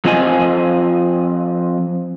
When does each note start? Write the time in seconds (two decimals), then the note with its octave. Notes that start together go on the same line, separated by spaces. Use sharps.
0.05 F3 C4 F4 D#5 G#5